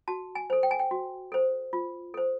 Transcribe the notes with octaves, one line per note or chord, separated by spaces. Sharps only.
F#4 A5
G#5
A4 C5
G5
G#5
G5
F#4
A4 C5
F4
A4 C5